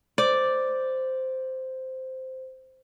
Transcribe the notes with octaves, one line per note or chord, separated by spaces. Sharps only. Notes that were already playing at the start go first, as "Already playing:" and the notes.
C5 D5